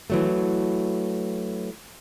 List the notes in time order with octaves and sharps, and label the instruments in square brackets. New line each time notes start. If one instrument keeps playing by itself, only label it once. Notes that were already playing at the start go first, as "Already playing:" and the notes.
[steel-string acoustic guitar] E3 F#3 A3